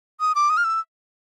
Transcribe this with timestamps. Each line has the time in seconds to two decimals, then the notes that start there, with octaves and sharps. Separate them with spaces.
0.20 D#6
0.35 D6
0.50 D#6
0.57 F6
0.64 E6